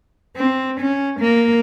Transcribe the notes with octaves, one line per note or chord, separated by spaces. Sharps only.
C4
C#4
A#3